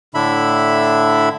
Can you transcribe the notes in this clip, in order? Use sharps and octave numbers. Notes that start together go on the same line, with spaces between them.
A2 D3 D4 E4 E5 B5